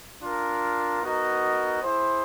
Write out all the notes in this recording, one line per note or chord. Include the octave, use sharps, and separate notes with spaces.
D4 F4 A#4
B3 D#4 F#4 A#4 D#5
E4 G#4 C5